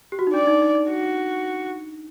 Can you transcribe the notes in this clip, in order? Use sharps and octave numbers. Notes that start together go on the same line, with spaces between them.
G4
F#4
D#4
D4 D5
D#4
D#4
D#4
F#4